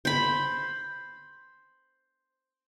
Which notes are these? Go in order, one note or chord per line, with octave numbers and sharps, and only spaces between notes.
C5 B5